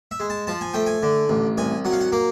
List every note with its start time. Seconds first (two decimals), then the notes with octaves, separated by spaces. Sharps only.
0.11 E5
0.20 G#3
0.30 A5
0.47 F3 A5
0.61 G#5
0.74 A3 G5
0.86 G#5
1.03 D3
1.29 A1
1.58 C2 G#5
1.85 F#3 F#5
1.93 F5
2.01 F#5
2.12 A#3 F5